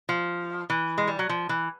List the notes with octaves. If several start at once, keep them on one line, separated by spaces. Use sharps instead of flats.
F3
E3
G#3
G3
F#3
F3
E3